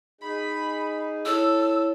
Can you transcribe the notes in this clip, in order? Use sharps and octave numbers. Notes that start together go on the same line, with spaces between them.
D#4 G#4 B5
E4 A4 C#5 E6